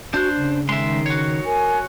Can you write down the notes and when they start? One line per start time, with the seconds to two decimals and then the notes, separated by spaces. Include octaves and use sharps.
0.14 D4 F#4 C5 F#6
0.38 C#3
0.69 D#3 G#3 E5 C6
1.06 F#4 C#5
1.45 A#4 G#5